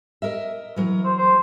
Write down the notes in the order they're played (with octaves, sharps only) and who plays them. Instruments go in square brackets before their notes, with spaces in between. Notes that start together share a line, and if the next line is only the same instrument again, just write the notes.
[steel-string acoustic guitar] A#4 D#5 E5
E3 F#3 A#4
[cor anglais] C5
C5